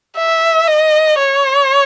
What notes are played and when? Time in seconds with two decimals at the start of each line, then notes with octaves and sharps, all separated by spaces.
0.17 E5
0.68 D#5
1.19 C#5